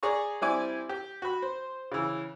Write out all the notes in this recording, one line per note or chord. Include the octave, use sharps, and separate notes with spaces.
G#4 D5 A#5 C#6
G3 C4 E4 G#5 D6
G4
F#4 B5
C5
C#3 E3